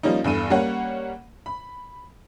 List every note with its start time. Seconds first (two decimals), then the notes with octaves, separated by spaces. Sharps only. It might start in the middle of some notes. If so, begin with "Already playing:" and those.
0.03 F3 G3 A#3 C#4 D#4
0.24 E2 G2 A4 D#7
0.50 G3 A#3 C#4 C#5 F#5
1.46 B5